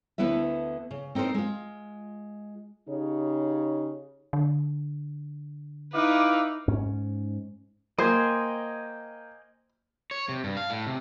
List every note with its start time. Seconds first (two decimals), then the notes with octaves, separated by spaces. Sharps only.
0.18 D2 D3 B3 E4 B4 E5
0.91 C#3
1.15 C4 D#4 A4 A#4 C5
1.34 G#3 F4
2.87 C#3 D#4 G4 C#5
4.33 D3
5.93 D#4 E4 B4 F5 D6
6.68 G#2 C#4
7.98 A#3 C5 D#5 G5 G#5
10.11 C#5
10.29 C3
10.44 G2
10.57 F5
10.70 A2
10.87 C3